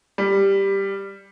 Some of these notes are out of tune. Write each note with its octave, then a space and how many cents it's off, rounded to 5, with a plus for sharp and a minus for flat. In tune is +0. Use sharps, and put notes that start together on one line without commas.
G3 +5